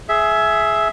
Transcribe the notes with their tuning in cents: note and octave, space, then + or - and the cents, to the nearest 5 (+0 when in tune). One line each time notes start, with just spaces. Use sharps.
G#4 +15 E5 +0